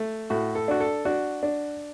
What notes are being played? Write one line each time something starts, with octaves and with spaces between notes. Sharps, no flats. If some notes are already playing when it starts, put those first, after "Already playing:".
Already playing: A3
A2 F#4
A4
D4 F#4
A4
D4 F#4
D4